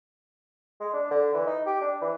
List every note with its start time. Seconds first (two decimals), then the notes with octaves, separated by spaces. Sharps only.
0.80 G#3
0.93 D4
1.11 D3
1.34 E3
1.47 D#4
1.66 G4
1.81 D4
2.02 E3